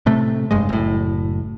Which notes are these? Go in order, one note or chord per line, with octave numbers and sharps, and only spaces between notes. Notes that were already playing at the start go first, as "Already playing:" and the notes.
A2 C3 A3
F1 G2 G#3
F#1 A2